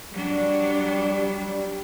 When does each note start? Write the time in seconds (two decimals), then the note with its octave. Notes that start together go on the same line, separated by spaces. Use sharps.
0.13 F#3 G3 D4